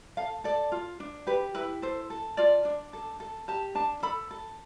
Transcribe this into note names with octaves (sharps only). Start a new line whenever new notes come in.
A4 F5
A4 D5
F4
D4
G4 B4
E4 B4
A4 C5
A4
F4 D5
D4
A4
A4
G4 A5
D4 A5
A4 B5
A4